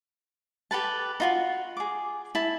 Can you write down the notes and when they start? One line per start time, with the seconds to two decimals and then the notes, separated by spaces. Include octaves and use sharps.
0.71 G4 A4 B4 A5
1.20 D#4 F4 F#4
1.77 G#4 D6
2.35 E4 A5